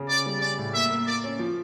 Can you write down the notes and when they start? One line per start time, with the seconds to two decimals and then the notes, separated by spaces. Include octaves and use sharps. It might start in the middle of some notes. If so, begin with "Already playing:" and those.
Already playing: C#3
0.09 C#4 D5
0.26 G3
0.41 C#4 D5
0.58 A2
0.74 A#3 E5
0.90 A#3
1.07 A#3 D5
1.24 C#4
1.39 F3